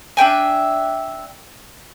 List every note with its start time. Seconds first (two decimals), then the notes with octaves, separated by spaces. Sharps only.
0.17 D4 E5 G5 G#5